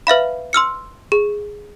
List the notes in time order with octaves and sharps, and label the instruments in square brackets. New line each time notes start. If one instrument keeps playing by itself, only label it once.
[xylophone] B4 E5 F5 B5
C6 E6 F6 C#7
G#4